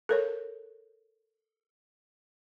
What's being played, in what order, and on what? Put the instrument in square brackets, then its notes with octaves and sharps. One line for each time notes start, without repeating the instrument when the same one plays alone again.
[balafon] A4 A#4 C#5